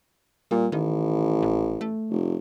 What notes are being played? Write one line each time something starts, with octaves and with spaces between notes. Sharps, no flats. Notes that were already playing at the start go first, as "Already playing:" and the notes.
A#2 G3
A1 D#3
A#1
A3
F1